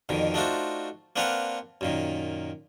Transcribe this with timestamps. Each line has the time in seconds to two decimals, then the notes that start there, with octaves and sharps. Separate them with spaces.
0.09 F2 B2 D3 D#3
0.34 A3 D4 D#4 F4 F#4 C5
1.16 A#3 C4 D4 B4 F5 F#5
1.81 F#2 A#2 D#3